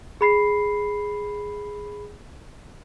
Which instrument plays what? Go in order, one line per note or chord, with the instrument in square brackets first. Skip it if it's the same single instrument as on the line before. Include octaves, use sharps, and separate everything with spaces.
[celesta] G#4 B5 C7